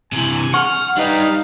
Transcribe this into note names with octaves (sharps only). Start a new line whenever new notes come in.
C3 E3 G#5
F#5 C#6 F6
G3 D#4 B4 F5